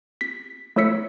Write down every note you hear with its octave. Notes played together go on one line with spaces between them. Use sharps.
B6
A3 E4 C#5 E6 B6 C#7